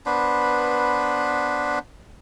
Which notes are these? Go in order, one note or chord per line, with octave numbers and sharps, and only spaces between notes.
B3 D4 B4 C5